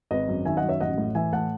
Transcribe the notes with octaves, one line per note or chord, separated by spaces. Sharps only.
G#1 B4 D#5
F#2
D#3 E5 G#5
D#5 F#5
F#2
C#5 E5
A1 D#5 F#5
A2
E3 E5 G#5
A2 F#5 A5